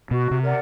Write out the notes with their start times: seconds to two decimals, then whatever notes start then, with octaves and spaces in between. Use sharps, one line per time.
0.11 B2 F#4
0.31 C3
0.42 A#4 D5 F#5